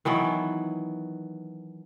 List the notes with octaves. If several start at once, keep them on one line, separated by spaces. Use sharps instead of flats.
D#3 E3 F#3 B3